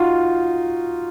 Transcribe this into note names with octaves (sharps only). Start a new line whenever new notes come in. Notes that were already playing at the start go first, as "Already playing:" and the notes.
Already playing: D#4 F4 F#4